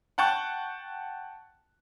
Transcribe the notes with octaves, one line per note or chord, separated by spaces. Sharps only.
F#5 G5 A5 C#6 F#6